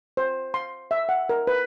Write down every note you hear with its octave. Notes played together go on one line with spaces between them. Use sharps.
C5
C6
E5
F#5
A#4
B4